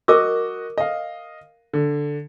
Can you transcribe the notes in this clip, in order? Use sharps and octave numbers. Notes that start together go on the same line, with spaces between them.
F#4 A#4 D#5 D6 E6
D#5 F5
D3